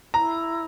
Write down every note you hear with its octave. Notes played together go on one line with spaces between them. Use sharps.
E4 A#5